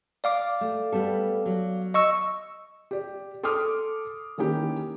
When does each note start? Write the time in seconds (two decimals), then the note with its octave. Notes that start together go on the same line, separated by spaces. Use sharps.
0.24 D5 F5 D6
0.61 A3
0.92 G3 B3 A4
1.46 F#3
1.94 D#5 C#6 E6
2.91 G4 D5
3.43 A4 C6 D6 D#6 F6
4.38 D#3 E3 A#3 C#4 D#4 G4